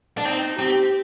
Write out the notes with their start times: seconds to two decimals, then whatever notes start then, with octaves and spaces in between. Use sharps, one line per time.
0.18 D4
0.25 C4 D#4
0.59 C4 G4